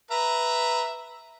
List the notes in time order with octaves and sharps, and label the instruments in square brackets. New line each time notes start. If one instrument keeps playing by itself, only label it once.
[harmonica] B4 E5 A#5